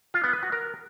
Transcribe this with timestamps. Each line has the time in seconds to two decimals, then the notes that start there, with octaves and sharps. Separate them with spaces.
0.14 F4
0.24 B3
0.33 B4
0.43 F#4
0.52 A#4